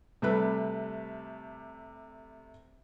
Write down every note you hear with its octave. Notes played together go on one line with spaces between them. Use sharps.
C3 G3 A3 B4